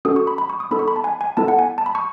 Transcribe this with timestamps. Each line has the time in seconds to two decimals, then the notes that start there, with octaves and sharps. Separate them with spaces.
0.05 C#4 F#4 A4 D#6
0.16 C#6
0.27 B5
0.38 B5
0.50 C#6
0.60 D#6
0.71 B3 D#4 A4 B5
0.79 C#6
0.88 B5
0.96 A5
1.04 G#5
1.21 G#5
1.37 B3 E4 A4 A5
1.48 F#5
1.59 G#5
1.78 A5
1.86 B5
1.95 C#6